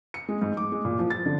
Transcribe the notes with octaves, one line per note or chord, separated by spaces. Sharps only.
C#7
G#3
G#2
D6
G#3
A#2
F3
A6
D3